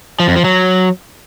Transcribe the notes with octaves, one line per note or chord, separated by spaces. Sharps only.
F3
F2
F3
F#3